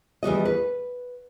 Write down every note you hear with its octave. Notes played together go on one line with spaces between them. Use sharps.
E2 G3 F#4 D#5
B4